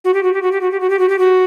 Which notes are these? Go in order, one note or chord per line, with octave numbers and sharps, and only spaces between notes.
F#4
G4
F#4
G4
F#4
G4
F#4
G4
F#4
G4
F#4
G4
F#4